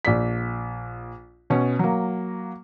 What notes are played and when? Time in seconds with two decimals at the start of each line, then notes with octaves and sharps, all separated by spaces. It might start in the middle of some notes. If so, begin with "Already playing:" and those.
0.05 A#1 D5 B6
1.50 B2 C#4
1.79 F#3 A#3